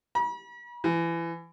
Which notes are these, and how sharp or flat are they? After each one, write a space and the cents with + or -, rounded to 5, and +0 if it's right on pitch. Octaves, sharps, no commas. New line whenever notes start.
B5 -45
E3 +25